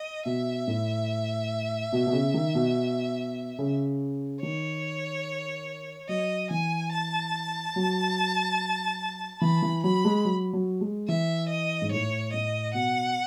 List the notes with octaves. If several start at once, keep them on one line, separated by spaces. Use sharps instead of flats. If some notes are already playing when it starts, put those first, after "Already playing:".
Already playing: D#5
B2 E5
A2
B2
B2
C#3
D#3
B2
C#3
D#3 C#5
F#3 D#5
E3 G#5
A5
F#3
E3 B5
E3
F#3 B5
G#3
F#3
F#3
G#3
E3 E5
D#5
G#2
A2 C#5
A2 D#5
B2 F#5